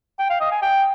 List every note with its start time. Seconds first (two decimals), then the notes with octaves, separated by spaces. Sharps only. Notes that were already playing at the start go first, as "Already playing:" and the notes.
0.19 G5
0.30 F5
0.41 D#5
0.51 G#5
0.62 G5